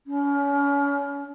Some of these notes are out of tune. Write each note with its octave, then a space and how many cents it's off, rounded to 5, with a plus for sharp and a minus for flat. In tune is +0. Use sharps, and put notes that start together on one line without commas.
C#4 +30